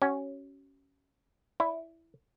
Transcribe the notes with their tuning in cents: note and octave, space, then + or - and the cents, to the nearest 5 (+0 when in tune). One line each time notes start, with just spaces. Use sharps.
C#4 +0 F#4 +40
E4 +0 D5 -20